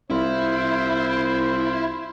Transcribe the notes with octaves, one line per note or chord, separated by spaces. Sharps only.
C2 E4 F4 C5